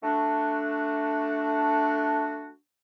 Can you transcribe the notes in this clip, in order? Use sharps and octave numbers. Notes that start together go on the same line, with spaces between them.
A3 D4 F#4